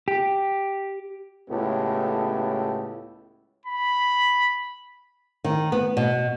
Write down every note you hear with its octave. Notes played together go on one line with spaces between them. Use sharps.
G4
C#2 A2 B3 G4 A4
B5
D#3
B3
B2